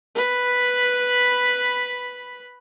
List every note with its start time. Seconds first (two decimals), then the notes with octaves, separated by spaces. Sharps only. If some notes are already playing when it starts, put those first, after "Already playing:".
0.15 B4 B5